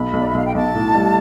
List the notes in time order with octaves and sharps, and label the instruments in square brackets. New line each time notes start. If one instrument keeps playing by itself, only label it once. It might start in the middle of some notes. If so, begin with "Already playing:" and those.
Already playing: [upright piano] B1 [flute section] B5
[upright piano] B1
[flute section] D5
E5
[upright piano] B1 [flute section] F5
[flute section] G5
[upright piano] B1 [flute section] A5
[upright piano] A2
G3